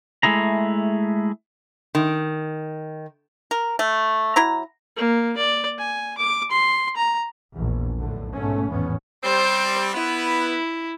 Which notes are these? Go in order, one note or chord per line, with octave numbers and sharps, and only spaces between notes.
G#3 A3 E4 G#4 A#5
D#3
A#4
A3
F#3 E4 A#5
A#3
D5
G#5
D6
C6
A#5
A#1 E2
B1 A2 D3
G#2 B2 A3 C#4
G#1 E2 A2 E3 B3 C#4
G3 C4 C5
B3 E4 B4